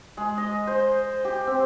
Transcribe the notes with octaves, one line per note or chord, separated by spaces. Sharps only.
G#3
D#5
C5
G4
C4